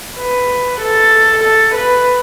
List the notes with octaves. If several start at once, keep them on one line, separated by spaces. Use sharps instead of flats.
B4
A4
A4
B4